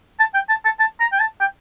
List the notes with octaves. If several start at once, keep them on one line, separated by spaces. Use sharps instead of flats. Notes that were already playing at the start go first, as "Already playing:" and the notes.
A5
G5
A5
A5
A5
A#5
G5
A5
G5